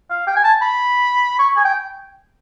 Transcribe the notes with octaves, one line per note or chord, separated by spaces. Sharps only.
F5
G5
G#5
A5
B5
C#6
G#5
G5